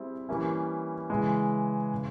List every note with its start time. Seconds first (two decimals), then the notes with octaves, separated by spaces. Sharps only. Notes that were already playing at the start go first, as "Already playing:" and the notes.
Already playing: G3 C4 E4 G#4 E5
0.29 E3 G3 A#3 C#4 E4
1.10 C#3 E3 G#3
1.94 C#3